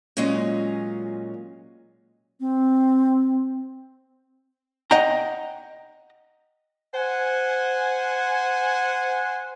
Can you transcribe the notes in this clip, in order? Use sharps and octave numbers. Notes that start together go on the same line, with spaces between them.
A#2 F#3 G#3 C#4 F4 D#5
C4
D#5 F#5 G5 A#5
C5 F#5 G#5